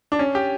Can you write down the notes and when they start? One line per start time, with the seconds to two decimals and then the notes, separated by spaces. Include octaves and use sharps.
0.12 D4
0.19 C#4
0.35 G4